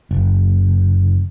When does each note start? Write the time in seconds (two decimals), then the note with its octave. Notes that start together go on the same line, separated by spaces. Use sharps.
0.11 F#1